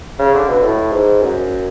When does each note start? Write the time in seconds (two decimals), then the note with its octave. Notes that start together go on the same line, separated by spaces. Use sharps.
0.19 C#3
0.34 D3
0.48 B2
0.63 A2
0.92 G#2
1.21 F#2